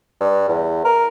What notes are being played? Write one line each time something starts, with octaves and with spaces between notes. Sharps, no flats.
G2
E2
A#4